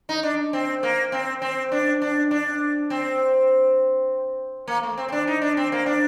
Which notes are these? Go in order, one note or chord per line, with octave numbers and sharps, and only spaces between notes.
D#4
D4
C4
A#3
C4
C4
D4
D4
D4
C4
A#3
A3
C4
C4
D4
D#4
D4
C4
A#3
D4